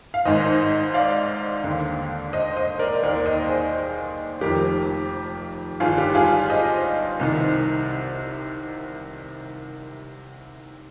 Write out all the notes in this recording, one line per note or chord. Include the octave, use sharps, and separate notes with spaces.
F5
G#1 G#2 D#3 C5 D#5
D5 F5
D#2 D3
C5 D#5
C5 D#5
A#4 D5
D#2 D#3 A#4 D5
C5 D#5
G#4 C5
F1 F2 D#3 G4 A#4
G1 G2 D#3 F4 G#4
G4
F4 G#4
C5 D#5
C2 C3 D#3